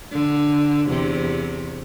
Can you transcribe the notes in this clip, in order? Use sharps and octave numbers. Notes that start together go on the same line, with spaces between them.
D3
E2 C3